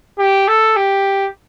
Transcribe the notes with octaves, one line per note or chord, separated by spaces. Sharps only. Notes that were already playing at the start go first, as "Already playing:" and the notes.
G4
A4
G4